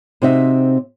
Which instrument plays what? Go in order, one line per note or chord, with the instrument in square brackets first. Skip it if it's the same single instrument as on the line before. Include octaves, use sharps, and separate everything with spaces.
[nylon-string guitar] C3 C4 D#4 F#4 E5